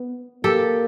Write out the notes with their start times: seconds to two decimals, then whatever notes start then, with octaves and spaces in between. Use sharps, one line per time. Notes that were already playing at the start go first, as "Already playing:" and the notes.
Already playing: B3
0.44 A#3 G4 A4